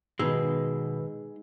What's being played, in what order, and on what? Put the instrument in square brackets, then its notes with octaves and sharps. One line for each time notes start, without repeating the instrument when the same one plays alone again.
[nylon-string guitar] B2 [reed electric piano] D#3 B4 E6 [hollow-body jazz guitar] G#3 D#4